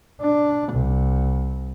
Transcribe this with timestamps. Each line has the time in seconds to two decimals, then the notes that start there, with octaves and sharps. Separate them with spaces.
0.21 D4
0.73 C2